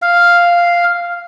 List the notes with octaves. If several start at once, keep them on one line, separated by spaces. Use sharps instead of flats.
F5